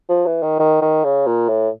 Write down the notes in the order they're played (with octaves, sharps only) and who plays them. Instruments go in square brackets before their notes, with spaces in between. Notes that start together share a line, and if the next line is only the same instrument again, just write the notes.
[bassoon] F3
E3
D#3
D#3
D#3
C#3
A#2
A2